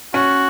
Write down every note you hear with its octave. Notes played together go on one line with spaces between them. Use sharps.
C#4 F#4